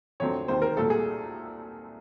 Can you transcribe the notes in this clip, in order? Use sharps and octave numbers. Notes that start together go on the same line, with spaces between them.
F2 D3 F#3 A3 C4 C#5
E1 D#2 D#3 G#3 C4 C5
A#4
C2 A#2 F#3 A3 A4
G#4